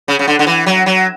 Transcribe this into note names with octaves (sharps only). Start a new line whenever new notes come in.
C#3
C#3
D3
D3
E3
F#3
F#3